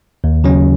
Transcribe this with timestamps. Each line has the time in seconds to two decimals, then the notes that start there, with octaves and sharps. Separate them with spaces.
0.24 D#2
0.44 C#3 F#3 C#4